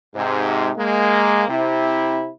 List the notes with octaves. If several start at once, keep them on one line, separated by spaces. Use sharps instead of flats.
G#2 C3
G#3 A#3
C3 E4